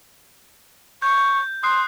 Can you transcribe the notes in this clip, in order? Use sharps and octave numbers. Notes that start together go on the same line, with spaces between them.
C#6 G6
C6 D#6 F#6 C7